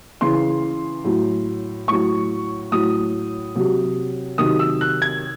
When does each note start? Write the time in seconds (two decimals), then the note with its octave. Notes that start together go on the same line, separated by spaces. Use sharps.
0.21 C#3 E3 C6
1.04 A2 F#3
1.88 A2 F#3 C#6
2.71 A2 F#3 D#6
3.55 C3 F#3
4.38 C3 D#3 F#3 D#6
4.59 E6
4.81 F#6
5.02 G#6